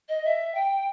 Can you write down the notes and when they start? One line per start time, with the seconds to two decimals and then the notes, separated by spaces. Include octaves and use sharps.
0.09 D#5
0.25 E5
0.55 G5